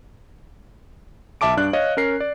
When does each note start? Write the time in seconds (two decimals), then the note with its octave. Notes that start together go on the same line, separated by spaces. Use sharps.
1.41 B1 E5 A5 D6 D7
1.57 G2 D4 F#6
1.73 C#5 D#5 F5
1.97 C#4 A#4 C7
2.20 D5